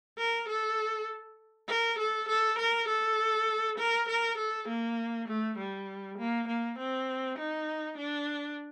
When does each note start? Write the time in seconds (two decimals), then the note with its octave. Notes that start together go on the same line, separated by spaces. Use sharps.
0.17 A#4
0.48 A4
1.68 A#4
1.98 A4
2.28 A4
2.58 A#4
2.88 A4
3.78 A#4
4.08 A#4
4.37 A4
4.68 A#3
5.28 A3
5.57 G3
6.18 A#3
6.48 A#3
6.78 C4
7.38 D#4
7.97 D4